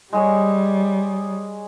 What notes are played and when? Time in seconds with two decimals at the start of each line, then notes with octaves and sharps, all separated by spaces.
0.13 G3 G#3 G#4 C#5